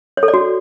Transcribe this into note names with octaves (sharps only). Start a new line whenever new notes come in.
C#5
A4
D5
F#4